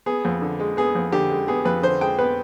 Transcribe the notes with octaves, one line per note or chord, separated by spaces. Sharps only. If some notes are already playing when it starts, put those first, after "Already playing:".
B3 G#4
F2
D3
G#3
B3 G#4
F2
D3 G4
G#3
B3 G#4
F2 B4
D3 C5
G#3 G5
B3 B4